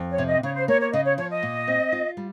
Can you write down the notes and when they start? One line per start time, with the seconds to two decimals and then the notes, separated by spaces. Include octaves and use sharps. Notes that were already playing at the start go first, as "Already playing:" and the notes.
Already playing: F2
0.11 C#5
0.18 C3
0.27 D#5
0.43 C#3 C#5
0.56 C5
0.68 A#3 C#5
0.80 C#5
0.93 C#3 D#5
1.05 C#5
1.17 F3 C#5
1.30 D#5
1.43 A#2
1.67 C4
1.92 F4
2.17 G3